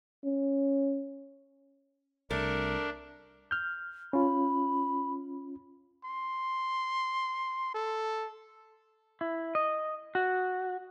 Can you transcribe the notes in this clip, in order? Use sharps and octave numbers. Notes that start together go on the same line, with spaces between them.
C#4
C2 A3 D4 A#4
F6 G6
C#4 F4 B5
C6
A4
E4
D#5
F#4